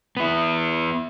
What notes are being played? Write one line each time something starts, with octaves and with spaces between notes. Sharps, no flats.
B3 E4